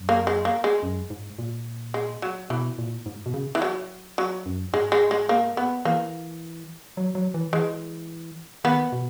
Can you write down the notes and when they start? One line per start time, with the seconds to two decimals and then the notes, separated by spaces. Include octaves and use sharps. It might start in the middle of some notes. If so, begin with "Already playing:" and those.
Already playing: F#2
0.09 A#3
0.27 G#3
0.45 A#3
0.64 G#3
0.83 F#2
1.10 G#2
1.39 A#2
1.94 G#3
2.22 F#3
2.50 B2 E3
2.78 A#2
3.06 G#2
3.26 B2
3.34 C#3
3.55 E3
3.62 F#3
4.18 F#3
4.46 F#2
4.73 G#2 G#3
4.92 G#3
5.11 G#3
5.29 A#3
5.57 B3
5.85 E3 A#3
6.97 F#3
7.15 F#3
7.34 E3
7.53 E3 G#3
8.64 D#3 B3
8.92 B2